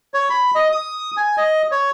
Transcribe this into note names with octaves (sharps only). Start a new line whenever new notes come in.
C#5
B5
D#5
D#6
G#5
D#5
C#5